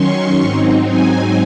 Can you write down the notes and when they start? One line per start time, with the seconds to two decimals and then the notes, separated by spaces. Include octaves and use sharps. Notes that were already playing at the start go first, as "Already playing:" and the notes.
Already playing: D#3 F#3 C#4 C6 C#6
0.40 G#2 F#3 C4 D#4
0.87 G#5